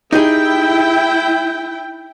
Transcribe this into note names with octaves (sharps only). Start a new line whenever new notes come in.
D#4 E4 G4 G#4 G5